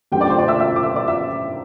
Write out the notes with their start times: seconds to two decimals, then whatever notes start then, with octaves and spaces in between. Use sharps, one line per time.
0.12 F#2 D3 A3 C4 G4 G5
0.21 D5 D6
0.30 C5 C6
0.38 D5 D6
0.48 E5 E6
0.60 E5 E6
0.76 D6
0.83 E5 E6
0.96 D5 D6
1.08 E5 E6